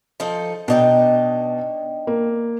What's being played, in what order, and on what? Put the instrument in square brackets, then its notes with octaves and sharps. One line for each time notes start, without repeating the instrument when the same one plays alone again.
[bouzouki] F3 D#4 A4
[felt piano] B2 [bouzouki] D4 D#4 G5
[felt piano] A#3